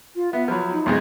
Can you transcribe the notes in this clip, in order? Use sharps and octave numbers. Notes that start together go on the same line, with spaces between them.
F4
B3 E5
F3 F#3 B5
D#4
B1 F2 G#3